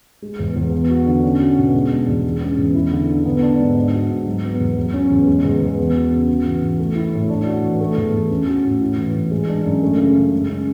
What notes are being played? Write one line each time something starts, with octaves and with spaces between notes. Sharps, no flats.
G#3
E2
E2
B3
F#4
D3
C#4
F#4
B2
G#3
D4
E2
G#3
C#4
E2
E4
D3
D3
B3
D4
G#2
D4
F#4
G#2
F#3
B3
E2
F#3
C#4
E2
G#3
E2
E2
B3
F#4
C#3
F#4
E3
E3
A3
E4
A2
D4
F#4
E3
A3
E2
E2
C#4
F#4
A2
E4
E3
E3
G#3
D4
F#2
A3
C#3
C#3
G#3
C#4